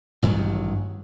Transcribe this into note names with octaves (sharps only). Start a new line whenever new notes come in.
A1 G2 D#3 F#3